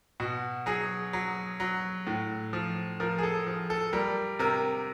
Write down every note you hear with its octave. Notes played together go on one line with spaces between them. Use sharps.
B2 F#4
F#3 G#4
F#3
F#3
A2
F3
F3 A#4
G#4
A4
F3
A4
G3 A#4
C3 A#4